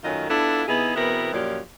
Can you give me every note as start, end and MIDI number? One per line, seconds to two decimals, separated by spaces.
0.04 0.27 42
0.04 0.27 51
0.04 0.27 57
0.04 0.27 61
0.04 0.27 65
0.04 0.27 75
0.29 0.62 59
0.29 0.62 62
0.29 0.62 64
0.29 0.62 65
0.29 0.62 69
0.67 0.91 48
0.67 0.91 59
0.67 0.91 63
0.67 0.91 64
0.67 0.91 68
0.95 1.31 40
0.95 1.31 47
0.95 1.31 59
0.95 1.31 60
0.95 1.31 64
0.95 1.31 70
1.32 1.59 42
1.32 1.59 46
1.32 1.59 53
1.32 1.59 67
1.32 1.59 73
1.32 1.59 74